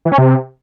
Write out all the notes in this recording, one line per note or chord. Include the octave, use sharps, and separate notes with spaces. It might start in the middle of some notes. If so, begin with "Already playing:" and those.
E3
C#4
C3